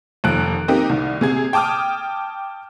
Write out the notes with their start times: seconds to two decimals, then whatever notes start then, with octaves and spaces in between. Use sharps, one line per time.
0.24 F1 D#2 F3 F#6 D7
0.68 A#3 C4 D#4 G4
0.90 C2 D#3
1.21 C3 G#4 G#6
1.53 G5 A5 D6 D#6 F6